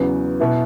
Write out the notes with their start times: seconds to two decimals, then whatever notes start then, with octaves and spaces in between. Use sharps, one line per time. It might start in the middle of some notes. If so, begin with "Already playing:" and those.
Already playing: E2 C#3 F#3 B3
0.40 B2 B3 E4